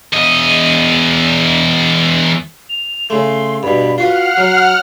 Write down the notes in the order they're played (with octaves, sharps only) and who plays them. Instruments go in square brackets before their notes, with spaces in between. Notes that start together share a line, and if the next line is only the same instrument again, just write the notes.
[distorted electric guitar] E2 D#5
[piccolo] F7
[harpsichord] C#3 A3 [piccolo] C6
[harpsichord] G2 B2 [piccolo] B5
[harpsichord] F4 F#4 B4 [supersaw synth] F#5 F6 [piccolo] C7
[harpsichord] F#3